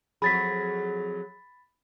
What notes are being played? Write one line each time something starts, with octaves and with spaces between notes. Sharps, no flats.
F2 F#3 G#4 B5 A6 B6